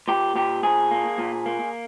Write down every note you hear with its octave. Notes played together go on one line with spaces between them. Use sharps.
A#2 G4
A#2 G4
A#2 G#4
A#3
A#2
A#3